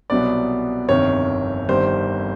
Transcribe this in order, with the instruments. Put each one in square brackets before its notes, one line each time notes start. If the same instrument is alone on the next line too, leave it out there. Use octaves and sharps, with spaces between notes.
[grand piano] C2 B2 F#3 B3 D5
G1 F2 C3 D#3 C#5
G1 F2 C3 D#3 G3 C5